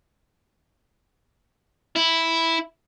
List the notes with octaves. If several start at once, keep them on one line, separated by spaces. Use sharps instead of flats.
E4